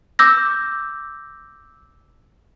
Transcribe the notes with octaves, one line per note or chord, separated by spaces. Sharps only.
D6 E6 G6 A#6